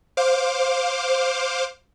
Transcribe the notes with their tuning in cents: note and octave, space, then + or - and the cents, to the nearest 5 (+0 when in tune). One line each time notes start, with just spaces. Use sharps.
C5 +5 F5 +20 D6 +0